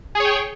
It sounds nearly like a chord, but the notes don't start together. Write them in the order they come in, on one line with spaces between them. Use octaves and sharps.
G#4 C#5 G5